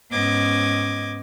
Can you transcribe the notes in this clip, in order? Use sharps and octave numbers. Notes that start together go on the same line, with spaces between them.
G#2 B3 C#4 D#5 D6 G#6